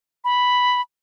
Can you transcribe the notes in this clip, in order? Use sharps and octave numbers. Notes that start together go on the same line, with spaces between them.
B5